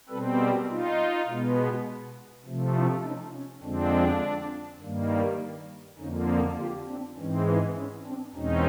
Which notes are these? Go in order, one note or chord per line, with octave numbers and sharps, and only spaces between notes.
B2 G3 C4 A4 B4
G#4 A#4
D#4 F4
B2 G#3 B3
C3 F3 A3
D4 E4
C#4 D#4
C#4
F2 D3 F3 G#3 C4 D4
G2 D#3 G3 A#3
F2 D3 F3 A#3 C#4 D#4
C4 D4
F4 G4
C4 D4
G#2 E3 G#3 C4 C#4
C4
C#4
C4 D4
E2 B2 G#3 C4 C#4 D#4